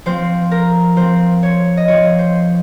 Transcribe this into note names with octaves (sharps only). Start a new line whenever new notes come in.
F3 C4 C5
A#4
F3 C4 C5
C#5
D#5
F3 C4 C#5
C5